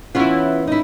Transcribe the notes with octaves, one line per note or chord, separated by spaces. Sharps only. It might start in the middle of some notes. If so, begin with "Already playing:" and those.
E3 B3 C#4 E4 F4
D#4 E4